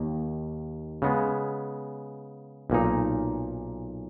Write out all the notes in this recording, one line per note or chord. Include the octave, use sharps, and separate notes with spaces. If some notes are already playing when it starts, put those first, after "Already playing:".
Already playing: D#2 D#3 A#3
C#3 G#3 B3
B1 A#2 A#3 D#4